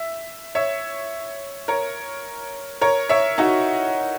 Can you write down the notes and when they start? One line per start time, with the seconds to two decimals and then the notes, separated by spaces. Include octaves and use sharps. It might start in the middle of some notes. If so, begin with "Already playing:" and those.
Already playing: E5
0.55 C#5 E5
1.68 A#4 C#5
2.81 A#4 C#5
3.09 C#5 E5
3.38 D#4 F#4